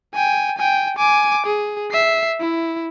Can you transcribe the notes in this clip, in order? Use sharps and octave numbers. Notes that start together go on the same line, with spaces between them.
G5 G#5
G5 G#5
G#5 D6
G#4
E5 C7
E4